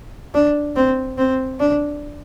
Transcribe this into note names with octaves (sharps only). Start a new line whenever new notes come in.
D4
C4
C4
D4